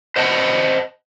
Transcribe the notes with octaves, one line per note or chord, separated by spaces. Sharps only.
C5 D#5 F#5 A5